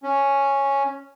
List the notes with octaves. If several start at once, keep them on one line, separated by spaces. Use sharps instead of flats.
C#4